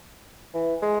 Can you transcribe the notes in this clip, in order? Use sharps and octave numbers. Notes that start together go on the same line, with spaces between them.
E3
G#3